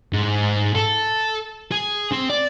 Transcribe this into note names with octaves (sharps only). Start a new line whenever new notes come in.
G#2
A4
G#4
C4
D5